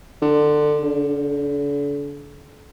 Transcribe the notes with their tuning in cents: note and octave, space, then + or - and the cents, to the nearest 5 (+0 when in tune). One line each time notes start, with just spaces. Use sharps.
D3 +20
D3 -40